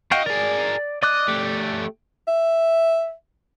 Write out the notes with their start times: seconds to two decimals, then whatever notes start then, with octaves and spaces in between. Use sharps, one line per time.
0.11 D#4 F#4 F5 G5
0.26 G#4 A#4 D5
1.03 D5 D#5 D6 F#6
1.28 A3 G4
2.28 E5